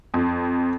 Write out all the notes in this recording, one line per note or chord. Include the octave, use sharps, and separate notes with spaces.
F2